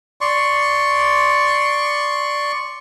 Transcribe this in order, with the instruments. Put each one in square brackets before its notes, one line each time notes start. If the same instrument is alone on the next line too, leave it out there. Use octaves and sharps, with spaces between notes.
[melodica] D5 C6 C#6